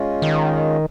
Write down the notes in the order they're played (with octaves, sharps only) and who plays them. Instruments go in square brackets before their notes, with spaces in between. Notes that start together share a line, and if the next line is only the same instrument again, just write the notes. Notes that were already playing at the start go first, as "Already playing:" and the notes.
Already playing: [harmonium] G#3 C#4 F4
[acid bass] D#3